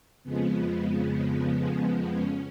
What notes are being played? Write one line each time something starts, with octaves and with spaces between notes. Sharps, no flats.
F2 C#3 F3 G#3 B3
C#4